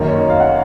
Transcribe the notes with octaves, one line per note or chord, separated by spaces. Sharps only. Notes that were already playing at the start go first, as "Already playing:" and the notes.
Already playing: F#2 D#3 A#3 C#4
C#5
D#5
F5
F#5